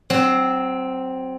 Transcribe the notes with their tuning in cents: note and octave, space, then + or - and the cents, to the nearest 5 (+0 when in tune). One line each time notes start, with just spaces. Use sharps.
F#3 +30 C4 +0